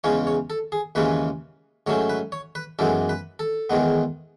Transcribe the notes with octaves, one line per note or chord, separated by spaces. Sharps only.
E2 C#3 G#3 C#4 C#5
C#5
A4
G#4
D#2 C#3 E3 G#3 C#4 B4
G#2 F#3 A3 C#4 C#5
B4
C#5
B4
F#2 E3 G#3 B3 A4
B4
A4
E2 D#3 G#3 B3